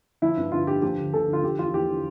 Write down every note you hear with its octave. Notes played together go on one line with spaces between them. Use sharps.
F3 E4
G2
G2 F4
D3 G4
F3 G4
D2
D2 A4
D3
F4
F3 G4
E2 F4
E2 G4
D3